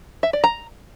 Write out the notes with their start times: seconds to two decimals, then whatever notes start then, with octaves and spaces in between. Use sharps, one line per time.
0.23 E5
0.33 D5
0.44 A#5